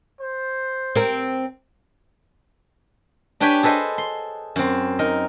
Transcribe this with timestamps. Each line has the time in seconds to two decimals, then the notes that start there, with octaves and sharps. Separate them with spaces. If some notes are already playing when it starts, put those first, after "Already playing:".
0.20 C5
0.95 C4 A#4
3.40 D4 G4 B4 C#5 G5 G#5
3.63 G#4 A4 B4 C5 D#5
3.98 C6
4.56 F#2 C4
4.99 D#4 A#4